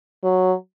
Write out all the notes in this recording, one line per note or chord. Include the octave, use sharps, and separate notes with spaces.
F#3